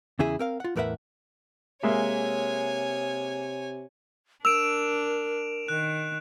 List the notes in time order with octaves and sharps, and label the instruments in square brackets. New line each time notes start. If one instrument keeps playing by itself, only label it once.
[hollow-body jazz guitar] E2 C#3 E4 G#4 E5
C4 A#4 F5
F4 F#5
E2 A2 A#4 B4 E5 F#5
[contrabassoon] C3 [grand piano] G#3 A#3 E5 [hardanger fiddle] C#5 G#5
[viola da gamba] D4 [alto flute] A#4 [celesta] E6 [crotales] D7 E7 F7
[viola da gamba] D#3 [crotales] F#6